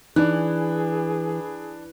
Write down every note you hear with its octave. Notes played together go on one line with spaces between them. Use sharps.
E3 D4 D#4 G#4 F#6